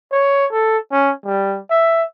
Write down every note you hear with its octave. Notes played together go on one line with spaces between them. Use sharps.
C#5
A4
C#4
G3
E5